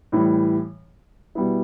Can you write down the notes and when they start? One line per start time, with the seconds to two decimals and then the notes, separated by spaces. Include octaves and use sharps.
0.12 A2 E3 G3
1.35 B2 G3 B3 E4